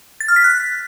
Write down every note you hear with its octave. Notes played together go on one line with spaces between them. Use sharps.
A6
F6
B6
F#6